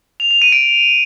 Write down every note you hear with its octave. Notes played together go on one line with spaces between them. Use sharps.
F7
F7
D#7
D7